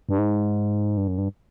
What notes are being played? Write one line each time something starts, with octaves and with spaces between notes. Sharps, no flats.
G2
G#2
G2
F#2
G2